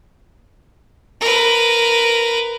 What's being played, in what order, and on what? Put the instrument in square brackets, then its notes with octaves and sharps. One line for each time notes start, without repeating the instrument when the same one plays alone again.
[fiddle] A#4 B4